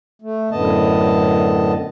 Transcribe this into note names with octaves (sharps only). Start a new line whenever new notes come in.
A3
F#2 A2 D3 B3 D#5 A5